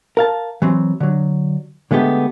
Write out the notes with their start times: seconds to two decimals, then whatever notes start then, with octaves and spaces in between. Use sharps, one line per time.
0.17 A#4 F5 A5
0.62 E3 F#3 C4
1.00 D3 F#3
1.91 D3 G#3 A3 B3 G4